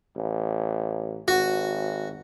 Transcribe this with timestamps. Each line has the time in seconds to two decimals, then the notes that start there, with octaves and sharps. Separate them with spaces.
0.16 A1
1.28 G#1 F#4